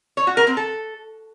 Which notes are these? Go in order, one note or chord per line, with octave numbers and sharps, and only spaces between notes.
C#5
F#4
A#4
C4
A4